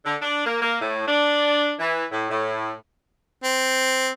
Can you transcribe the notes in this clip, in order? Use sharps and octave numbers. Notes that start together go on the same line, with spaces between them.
D3
D4
A#3
A#3
A2
D4
E3
A2
A2
C4